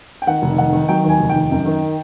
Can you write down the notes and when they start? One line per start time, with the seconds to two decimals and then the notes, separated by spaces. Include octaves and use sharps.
0.22 G5
0.27 D#3 F#5
0.42 F1
0.58 D#3 F#5
0.73 D#3
0.88 F#3 G5
1.04 D#2
1.09 G#5
1.19 F1
1.30 D#3 G5
1.51 F#2
1.66 D#3